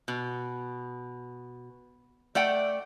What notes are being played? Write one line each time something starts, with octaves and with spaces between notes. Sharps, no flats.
B2
A3 D5 F#5 G5